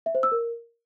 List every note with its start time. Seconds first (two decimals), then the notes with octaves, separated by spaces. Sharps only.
0.06 E5
0.15 C5
0.23 E6
0.32 A#4